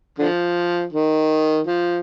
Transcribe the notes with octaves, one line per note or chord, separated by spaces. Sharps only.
D3 F3
D#3
F3